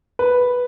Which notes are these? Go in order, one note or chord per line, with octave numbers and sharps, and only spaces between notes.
B4